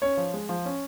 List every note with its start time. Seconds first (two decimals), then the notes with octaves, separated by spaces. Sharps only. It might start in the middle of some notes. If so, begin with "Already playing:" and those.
0.02 C#4 C#5
0.17 F3
0.34 G#3
0.49 F3
0.65 C#4